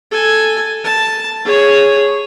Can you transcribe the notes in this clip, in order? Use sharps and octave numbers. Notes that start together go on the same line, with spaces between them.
A4 G#5
A5
G#4 C#5